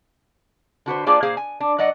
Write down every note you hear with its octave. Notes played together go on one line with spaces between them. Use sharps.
D3 F#4 B4 C5
A#3 D4 F4 G#4 C5 D5
A#2 A#3 G#4 C5 F5
G#5
D4
F#3 D5 D#5 F#5